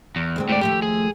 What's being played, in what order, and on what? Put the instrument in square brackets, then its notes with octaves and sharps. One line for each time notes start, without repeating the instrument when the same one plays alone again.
[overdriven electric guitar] E2
[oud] D2 G#3 C4
[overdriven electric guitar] A2 D5
[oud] D#2 F3 A3 [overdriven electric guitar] G4
[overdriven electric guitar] G#4